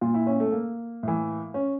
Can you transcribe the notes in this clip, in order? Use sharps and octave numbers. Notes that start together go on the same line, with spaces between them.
A#2 F4
E4
C#4
A3
A#3
A2 E3
C#4